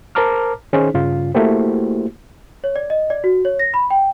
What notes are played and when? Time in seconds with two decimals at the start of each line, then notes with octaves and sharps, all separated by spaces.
0.15 A#4 C5 A5 A#5 D6 F6
0.73 D#3 C#4 D#4 G#4 C5
0.94 G2 C#3 F4
1.35 A3 A#3 E4 F#4 G4 C5
2.64 C#5
2.76 D5
2.90 D#5
3.10 D5
3.24 F#4
3.45 C#5
3.59 A#6
3.74 B5
3.90 G5